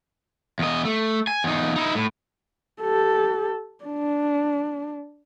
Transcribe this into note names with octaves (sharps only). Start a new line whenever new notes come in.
E2 D#5
A3
G#5
E2 D#4
D#4 E4
A2
G4 A4
D4